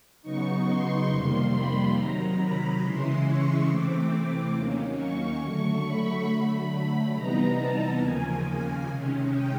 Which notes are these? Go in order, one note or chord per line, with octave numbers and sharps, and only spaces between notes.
C#3 F#3 B3 D#4 C#6
C6
F2 C3 D#3 G3 A#3 C6
B5
C3 D#3 F#3 A#5
B5
C#3 E3 G#3 C#4 E4 C6
C#6
C3 E3 A3 C4 D6
D#2 D#3 F#3 A#3 C#4
C#6
D3 F#3 A3
B5
D3 F#3 A3
C3 E3 G3 B3 D#4 A#5
A5
D#2 C#3 F3 A#3 G#5
C3 D#3 G#3 C#4
G5